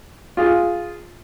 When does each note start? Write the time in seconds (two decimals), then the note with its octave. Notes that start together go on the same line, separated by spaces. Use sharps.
0.37 F4 G#4